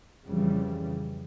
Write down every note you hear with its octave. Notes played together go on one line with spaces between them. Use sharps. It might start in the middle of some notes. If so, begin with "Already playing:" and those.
F2 C#3 E3 G3